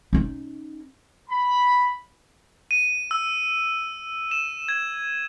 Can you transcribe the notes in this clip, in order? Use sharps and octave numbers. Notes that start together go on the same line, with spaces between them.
C#4 D#4
B5
D#7
E6
E7
G#6